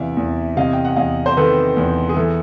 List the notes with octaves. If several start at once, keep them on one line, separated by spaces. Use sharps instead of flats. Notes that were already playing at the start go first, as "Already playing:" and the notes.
Already playing: E2 C3 E3 D5 E5 F5
E2
C3 D#5 F5
G5
F#5
E2 D#5 F5
C5
D#3 A4 B4
E2
G#4
E3 A4